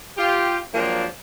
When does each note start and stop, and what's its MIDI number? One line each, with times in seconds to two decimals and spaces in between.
0.17 0.58 65
0.17 0.58 67
0.73 1.05 53
0.73 1.05 54
0.73 1.05 56
0.73 1.05 58
0.73 1.05 60
0.73 1.05 62